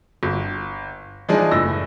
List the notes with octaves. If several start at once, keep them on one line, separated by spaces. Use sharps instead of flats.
G1
E3 F3 G#3 D4 D#4 G#4
F#1 A2 E6 A#6